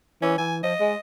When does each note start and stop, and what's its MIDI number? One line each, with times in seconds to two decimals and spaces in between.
0.22 0.38 52
0.22 0.38 61
0.38 0.59 52
0.38 0.56 80
0.63 0.74 53
0.63 0.99 75
0.80 0.93 56